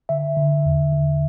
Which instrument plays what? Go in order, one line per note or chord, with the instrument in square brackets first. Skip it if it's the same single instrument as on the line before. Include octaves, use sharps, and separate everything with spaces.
[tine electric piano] D3 E5
D3
E2
D3